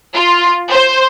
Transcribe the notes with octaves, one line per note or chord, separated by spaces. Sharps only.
F4
C5